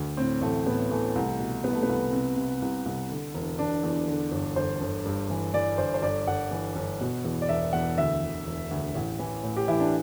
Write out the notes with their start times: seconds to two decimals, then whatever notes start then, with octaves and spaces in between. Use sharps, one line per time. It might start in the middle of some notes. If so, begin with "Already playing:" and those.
Already playing: D2
0.17 A2 C4
0.41 A1 A3
0.66 A2 B3
0.91 E3 A3
1.15 C2
1.40 B2
1.64 C2 B3
1.73 A3
1.83 B3
1.89 C2
2.12 C3
2.36 C3
2.62 C2
2.86 C2
3.10 D3
3.34 E1
3.59 E1 D4
3.83 E2
4.07 D3
4.32 G1
4.56 G1 C5
4.81 G1
5.05 G2
5.30 E3
5.54 E3 D5
5.78 G1 C5
5.94 C5
6.02 G1 D5
6.27 G1 F#5
6.51 E3
6.76 G1
7.01 B2
7.25 E2
7.42 D5
7.49 E1 E5
7.73 E2 F#5
7.98 D2 E5
8.22 D2
8.47 E1
8.71 D2
8.95 A1
9.19 E3
9.43 A2
9.57 G4
9.68 E3 E4
9.80 D4